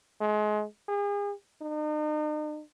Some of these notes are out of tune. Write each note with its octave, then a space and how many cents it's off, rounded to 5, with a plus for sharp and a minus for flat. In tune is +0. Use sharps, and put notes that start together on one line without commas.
G#3 +30
G#4 -40
D#4 -45